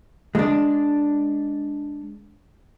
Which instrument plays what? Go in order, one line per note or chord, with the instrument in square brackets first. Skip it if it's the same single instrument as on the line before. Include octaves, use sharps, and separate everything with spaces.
[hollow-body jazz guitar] G#3 D4